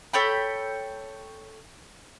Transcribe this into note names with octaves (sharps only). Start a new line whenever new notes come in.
A4 C#5 G5 B5